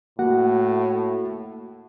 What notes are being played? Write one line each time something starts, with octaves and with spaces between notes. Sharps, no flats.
A2 A#3 F#4 F#5